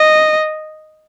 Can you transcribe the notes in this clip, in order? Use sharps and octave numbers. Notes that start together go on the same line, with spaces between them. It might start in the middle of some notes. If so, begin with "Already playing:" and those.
Already playing: D#5